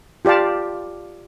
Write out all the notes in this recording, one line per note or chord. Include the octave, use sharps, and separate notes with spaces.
F4 G4 D5 F5 A5